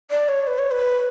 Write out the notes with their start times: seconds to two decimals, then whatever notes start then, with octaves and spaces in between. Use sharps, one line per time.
0.10 D5
0.28 C#5
0.47 B4
0.58 C#5
0.71 B4